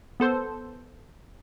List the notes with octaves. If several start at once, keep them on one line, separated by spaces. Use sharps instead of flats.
B3 A4 C5